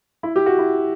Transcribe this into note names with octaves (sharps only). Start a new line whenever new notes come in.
E4
G4
F#4
E4